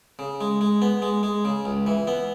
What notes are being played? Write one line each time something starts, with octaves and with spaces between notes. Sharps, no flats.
C#3
G#3
G#3
B3
G#3
G#3
C#3
C#2
E3
B3